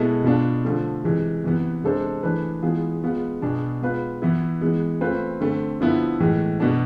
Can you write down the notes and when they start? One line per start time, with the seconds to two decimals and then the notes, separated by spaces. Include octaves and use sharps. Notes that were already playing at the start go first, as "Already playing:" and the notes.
Already playing: B2 G#3 B3 E4 A4
0.24 B2 B3 D4 F4
0.65 D3 F3 A3
1.04 C3 E3 G#3
1.44 C3 E3 B3
1.84 C3 G#3 D4 A4 C5
2.23 E3 A3 D4 G#4 B4
2.63 E3 G#3 B3 F4 G#4
3.03 G#3 B3 F4
3.42 B2 B3 D4 G#4
3.82 G#3 B3 F4 B4
4.22 E3 B3 E4
4.61 E3 G#3 B3
5.01 A3 C4 F4 B4
5.41 D3 A3 C4
5.81 D3 F3 B3 E4
6.20 A2 E3 G#3
6.60 B2 B3 D4